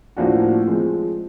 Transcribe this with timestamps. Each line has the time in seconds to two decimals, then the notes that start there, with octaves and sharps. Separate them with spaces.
0.17 A2 F3 A#3 D4 F#4
0.67 F3 G#3 C4